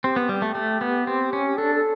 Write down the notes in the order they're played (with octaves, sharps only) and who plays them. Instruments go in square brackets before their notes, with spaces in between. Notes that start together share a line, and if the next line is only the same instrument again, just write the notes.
[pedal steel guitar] C4 [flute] G4
[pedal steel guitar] B3
G3
A3
A3
B3
C4
C#4
[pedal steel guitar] D4 [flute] A4
[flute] A4